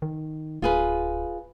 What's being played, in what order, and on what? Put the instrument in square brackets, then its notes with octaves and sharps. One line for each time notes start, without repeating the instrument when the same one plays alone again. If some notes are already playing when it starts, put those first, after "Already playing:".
[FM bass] D#3
[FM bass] D1 [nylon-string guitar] F4 G#4 B4